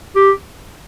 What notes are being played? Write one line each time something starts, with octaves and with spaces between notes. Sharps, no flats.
G4